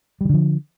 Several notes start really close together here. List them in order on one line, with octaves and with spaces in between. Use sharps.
G3 D#3 D3 F3